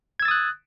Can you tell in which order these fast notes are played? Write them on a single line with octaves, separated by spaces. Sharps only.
G#6 E6 A6 D#6 F#6